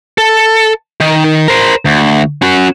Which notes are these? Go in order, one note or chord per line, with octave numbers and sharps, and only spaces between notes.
A4
D#3 D#4
A#4 C5
D2
C#4 F#4